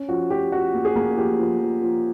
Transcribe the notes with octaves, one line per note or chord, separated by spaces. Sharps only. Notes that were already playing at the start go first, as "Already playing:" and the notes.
Already playing: C#4
F3 F#4
F3 G4
F3 F#4
A#3
G#4
A#3
F3 G4
F3
F3
F3